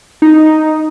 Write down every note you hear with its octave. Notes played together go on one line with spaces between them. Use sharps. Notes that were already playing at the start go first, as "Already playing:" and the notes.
D#4